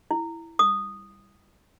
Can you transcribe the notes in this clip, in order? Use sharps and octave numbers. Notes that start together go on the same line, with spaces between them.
E4
D#6